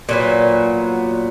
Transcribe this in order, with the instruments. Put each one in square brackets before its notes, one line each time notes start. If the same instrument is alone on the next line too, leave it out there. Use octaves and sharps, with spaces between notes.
[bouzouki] A#2 F#3 B3